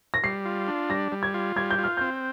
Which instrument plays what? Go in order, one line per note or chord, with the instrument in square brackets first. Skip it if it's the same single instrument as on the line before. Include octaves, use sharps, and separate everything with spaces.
[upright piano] A#6
[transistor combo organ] G3 [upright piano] C7
[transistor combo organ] F4
D4
[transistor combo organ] G3 [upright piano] A#6
[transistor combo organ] G3
[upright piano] G#6
[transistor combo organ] F4
[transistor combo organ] G3 [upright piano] G#6
[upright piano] G6
[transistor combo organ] F4
[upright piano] F6
[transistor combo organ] C4 [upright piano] G6